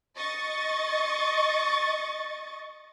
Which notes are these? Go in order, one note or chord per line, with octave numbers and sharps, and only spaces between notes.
D#5 C#6 A6